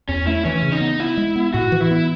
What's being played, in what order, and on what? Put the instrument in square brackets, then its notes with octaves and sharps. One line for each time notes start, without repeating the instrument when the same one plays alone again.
[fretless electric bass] E2 [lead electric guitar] C#4
[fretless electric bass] A3 [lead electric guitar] E4
[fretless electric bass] E3 [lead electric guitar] C#4
[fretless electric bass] C#3
[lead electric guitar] D#4
[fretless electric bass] B3
[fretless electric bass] B3 [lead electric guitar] E4
[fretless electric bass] G#3
B3
[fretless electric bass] A2 [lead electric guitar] F#4
[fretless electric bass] E3
[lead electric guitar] E4
[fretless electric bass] B3